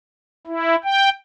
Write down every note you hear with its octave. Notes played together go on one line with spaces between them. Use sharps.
E4
G5